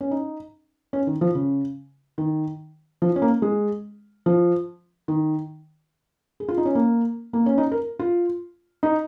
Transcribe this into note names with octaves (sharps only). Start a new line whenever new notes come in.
C#4
D#4
C#4
D#3
F3
C#3
D#3
F3
C#4
A#3
G#3
F3
D#3
G#4
F4
D#4
C#4
A#3
A#3
C#4
D#4
A#4
F4
D#4